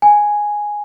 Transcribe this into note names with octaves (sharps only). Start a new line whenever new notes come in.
G#5